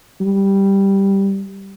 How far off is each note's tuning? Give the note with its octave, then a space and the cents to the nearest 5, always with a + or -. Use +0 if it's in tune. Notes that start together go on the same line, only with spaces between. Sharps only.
G3 +0